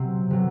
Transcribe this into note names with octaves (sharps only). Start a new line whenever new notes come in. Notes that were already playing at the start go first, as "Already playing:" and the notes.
Already playing: C3 F#3 C4
C3 F#3